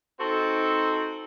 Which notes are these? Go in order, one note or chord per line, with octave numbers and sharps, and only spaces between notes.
C4 D#4 F#4 A4